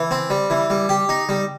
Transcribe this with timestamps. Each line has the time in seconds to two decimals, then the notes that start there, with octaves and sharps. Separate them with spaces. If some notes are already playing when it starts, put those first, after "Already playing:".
Already playing: E3
0.11 C4
0.30 G3
0.50 E3
0.70 G3
0.89 G4
1.09 D#4
1.29 G3